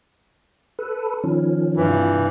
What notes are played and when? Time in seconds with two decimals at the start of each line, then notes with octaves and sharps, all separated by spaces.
0.79 A4 B4
1.24 D#3 F3 C#4
1.77 G2 E3
1.89 C3 F4